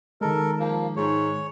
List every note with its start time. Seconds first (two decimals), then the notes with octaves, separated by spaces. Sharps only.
0.21 D#3 G#3 A4 A#4
0.59 F3 A#3
0.97 G#2 C#5